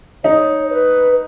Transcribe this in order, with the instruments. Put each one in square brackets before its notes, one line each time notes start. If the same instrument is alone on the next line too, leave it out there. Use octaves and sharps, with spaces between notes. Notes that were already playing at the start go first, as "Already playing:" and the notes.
[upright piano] D#4 [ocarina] C#5
[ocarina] B4